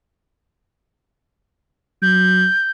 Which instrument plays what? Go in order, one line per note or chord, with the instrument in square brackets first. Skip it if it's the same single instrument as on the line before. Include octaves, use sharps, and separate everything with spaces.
[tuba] F#3 [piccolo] G6